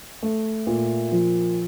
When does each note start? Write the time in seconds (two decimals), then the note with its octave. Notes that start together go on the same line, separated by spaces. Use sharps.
0.23 A3
0.67 A#2
1.12 F3